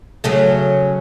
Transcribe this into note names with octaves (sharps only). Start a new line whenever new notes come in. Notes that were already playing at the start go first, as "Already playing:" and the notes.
C#3 F#3 A3